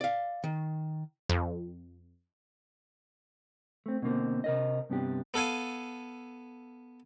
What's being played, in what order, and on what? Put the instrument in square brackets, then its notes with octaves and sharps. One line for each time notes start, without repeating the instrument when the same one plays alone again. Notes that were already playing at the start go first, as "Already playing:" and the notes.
[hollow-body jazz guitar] D5 F5
D#3
[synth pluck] F2
[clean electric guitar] A3 C4
B2 D3 A#3 C4
C3 A#4 D#5
G2 C3 B3 D4 G4
[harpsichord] B3 A4 F5 G#5